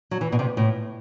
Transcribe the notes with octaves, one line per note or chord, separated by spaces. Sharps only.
F#3
E3
B2
C3
A2